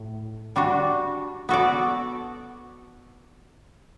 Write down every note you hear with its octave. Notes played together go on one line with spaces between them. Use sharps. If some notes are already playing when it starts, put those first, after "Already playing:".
Already playing: A2
G3 D4 F#4
B3 F#4 A4 D5